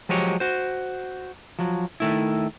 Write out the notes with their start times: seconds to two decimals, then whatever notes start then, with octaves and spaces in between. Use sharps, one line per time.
0.09 F3 F#3 G#3 G4 C#5
0.40 F#4 C5
1.59 F3 F#3
2.00 D#3 A3 E4